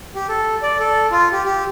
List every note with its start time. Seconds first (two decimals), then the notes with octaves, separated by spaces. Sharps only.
0.15 G4
0.29 A4
0.63 D5
0.79 A4
1.12 F4
1.32 G4
1.45 G4